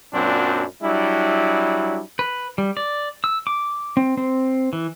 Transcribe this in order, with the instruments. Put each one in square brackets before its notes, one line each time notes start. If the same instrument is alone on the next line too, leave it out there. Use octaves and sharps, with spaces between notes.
[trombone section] F#2 A#2 F#3 C4 D4
F#3 G3 D4 E4
[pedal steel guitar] B4
G3
D5
E6
D6
C4
C4
E3